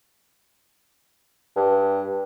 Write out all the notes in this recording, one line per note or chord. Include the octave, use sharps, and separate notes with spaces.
G2